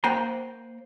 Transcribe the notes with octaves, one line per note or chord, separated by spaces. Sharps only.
A#3 C5 F#5 G5 A#5